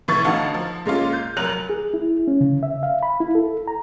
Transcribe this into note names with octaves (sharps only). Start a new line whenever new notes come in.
B1 E3 C#6 A6
A1 D3 D#4 F#4 F5 A5
F3
A#2 G#3 C#4 F4
G6
F1 F#3 A#4 F#6 F7 F#7
G#4
E4
C#4
C#3
E5
F5
B5
E4
A4
A#5